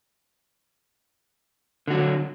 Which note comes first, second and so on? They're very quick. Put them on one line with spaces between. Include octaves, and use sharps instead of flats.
D3 F#4 F#3